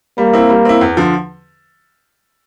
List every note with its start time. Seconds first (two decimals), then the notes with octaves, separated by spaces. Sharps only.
0.18 G3 A#3
0.33 C4 E4
0.50 G3
0.65 C4 E4
0.81 E2
0.97 D3 F3